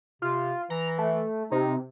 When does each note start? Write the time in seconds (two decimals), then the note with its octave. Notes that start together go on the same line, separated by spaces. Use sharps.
0.22 C3 F4
0.70 E3 A#5
0.98 A3
1.51 C3 D#4